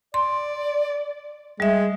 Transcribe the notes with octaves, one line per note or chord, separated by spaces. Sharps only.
D5 C6
G3 G#3 E5